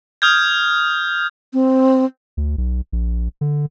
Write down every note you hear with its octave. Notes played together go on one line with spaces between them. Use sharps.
D#6 F6 G6 G#6
C4
D2
B1
A#1
D3